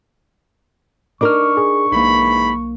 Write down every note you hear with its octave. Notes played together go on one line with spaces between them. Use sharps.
D4 D#4 A#4 C#6 D6 F6
G#4
B1 G#2 E3 A#3 B5